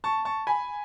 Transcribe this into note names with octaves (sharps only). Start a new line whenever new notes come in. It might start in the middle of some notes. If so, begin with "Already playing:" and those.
A5 C#6
A5 C#6
G#5 B5